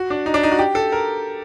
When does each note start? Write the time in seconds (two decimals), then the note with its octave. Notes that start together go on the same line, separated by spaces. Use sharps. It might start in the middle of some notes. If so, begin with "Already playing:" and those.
Already playing: F#4
0.10 D4
0.26 D#4
0.34 D4
0.43 D#4
0.52 F#4
0.59 G4
0.75 A4
0.92 A#4